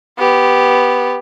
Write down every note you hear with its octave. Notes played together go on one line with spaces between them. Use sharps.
B3 G4